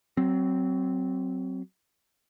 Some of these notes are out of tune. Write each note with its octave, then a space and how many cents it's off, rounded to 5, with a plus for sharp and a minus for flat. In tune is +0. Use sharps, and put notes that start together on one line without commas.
F#3 +25 C4 +0